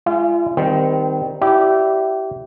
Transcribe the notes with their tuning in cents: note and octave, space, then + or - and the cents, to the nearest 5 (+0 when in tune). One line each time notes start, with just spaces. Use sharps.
G#3 +0 F4 -35 E5 +35
D#3 +0 G3 +0 C4 -25
E4 +0 G4 -25 D5 +0